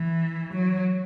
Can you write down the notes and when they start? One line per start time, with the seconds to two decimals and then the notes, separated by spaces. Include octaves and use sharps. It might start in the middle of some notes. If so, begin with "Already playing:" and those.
Already playing: E3
0.53 F#3